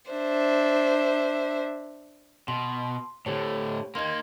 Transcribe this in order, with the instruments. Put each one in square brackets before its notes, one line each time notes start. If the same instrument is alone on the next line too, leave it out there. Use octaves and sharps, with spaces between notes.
[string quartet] D4 C5 E5
[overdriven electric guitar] B2 [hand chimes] C6
[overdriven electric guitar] A2 D3 [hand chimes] G4 C5 C#5
[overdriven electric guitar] A#3 D#4 [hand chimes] C6 G#6